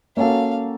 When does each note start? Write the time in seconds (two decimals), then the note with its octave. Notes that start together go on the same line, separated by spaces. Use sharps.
0.17 A#3 C#4 F#4 A4 F5